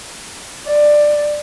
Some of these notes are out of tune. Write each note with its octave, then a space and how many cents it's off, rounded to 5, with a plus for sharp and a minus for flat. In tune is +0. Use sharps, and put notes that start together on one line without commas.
D5 +15